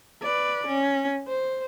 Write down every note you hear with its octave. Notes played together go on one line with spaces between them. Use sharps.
B4 D5
C#4
C5